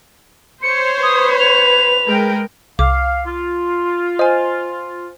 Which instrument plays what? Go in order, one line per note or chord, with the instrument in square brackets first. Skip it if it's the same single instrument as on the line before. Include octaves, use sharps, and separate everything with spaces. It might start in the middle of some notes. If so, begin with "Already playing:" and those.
[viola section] C5 C#5 [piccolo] C#7
[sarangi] B4 [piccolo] D#6
[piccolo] F7
[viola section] G#3 A#4 G5
[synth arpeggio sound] C2 [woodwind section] F5 [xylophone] D6
[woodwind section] F4
[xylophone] C5 G#5 [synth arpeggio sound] D#5